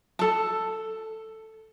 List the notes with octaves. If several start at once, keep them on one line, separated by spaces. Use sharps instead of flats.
A4 A5